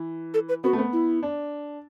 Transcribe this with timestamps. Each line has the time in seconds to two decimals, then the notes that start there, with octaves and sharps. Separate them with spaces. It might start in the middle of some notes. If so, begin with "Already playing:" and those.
Already playing: E3
0.34 A4
0.49 B4
0.64 B3 F#4
0.73 A3
0.78 B3
0.93 E4
1.23 D4